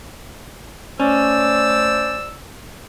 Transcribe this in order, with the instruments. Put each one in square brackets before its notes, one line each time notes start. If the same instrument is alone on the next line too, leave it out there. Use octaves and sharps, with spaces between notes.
[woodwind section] A3 C5 D5 [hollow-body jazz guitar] C#4 [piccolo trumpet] E6